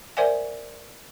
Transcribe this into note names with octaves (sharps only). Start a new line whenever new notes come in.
A#4 C5 D5 E5 F#5 G#5